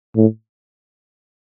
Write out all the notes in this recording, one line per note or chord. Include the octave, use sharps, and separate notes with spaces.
A2